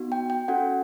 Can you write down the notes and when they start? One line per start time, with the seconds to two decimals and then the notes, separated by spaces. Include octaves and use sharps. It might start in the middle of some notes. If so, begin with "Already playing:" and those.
Already playing: B3 D#4 F#4
0.12 G5
0.30 G5
0.48 C#4 F#4 A4 F#5